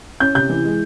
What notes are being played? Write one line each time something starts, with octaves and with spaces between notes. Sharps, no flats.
C#4 G6
C3 G6
E3
G#3